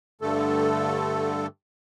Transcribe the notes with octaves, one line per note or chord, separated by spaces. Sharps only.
G2 D3 A3 A4